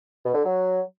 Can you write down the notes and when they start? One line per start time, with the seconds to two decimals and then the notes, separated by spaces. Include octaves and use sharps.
0.24 B2
0.34 D3
0.44 F#3